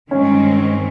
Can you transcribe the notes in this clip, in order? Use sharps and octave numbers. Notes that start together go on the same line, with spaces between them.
G2 D#3 G#3 C4 C#4